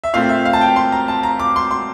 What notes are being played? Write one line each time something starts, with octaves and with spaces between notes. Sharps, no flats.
E5
A#2 A3 C4 F5
E5
F5
A5
G5
C6
A#5
A5
A#5
D6
C6
C6